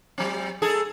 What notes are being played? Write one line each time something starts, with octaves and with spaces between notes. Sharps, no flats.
F#3 C4
G#2 G#4 A4